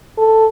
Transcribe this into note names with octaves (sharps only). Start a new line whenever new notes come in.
A4